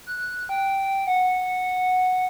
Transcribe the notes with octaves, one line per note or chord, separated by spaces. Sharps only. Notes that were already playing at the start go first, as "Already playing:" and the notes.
F#6
G5
F#5